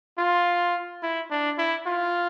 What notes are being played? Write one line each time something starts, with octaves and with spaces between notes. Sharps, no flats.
F4
E4
D4
E4
F4